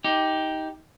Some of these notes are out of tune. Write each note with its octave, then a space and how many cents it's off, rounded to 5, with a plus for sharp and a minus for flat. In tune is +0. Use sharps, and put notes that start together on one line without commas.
D#4 +20 G4 +0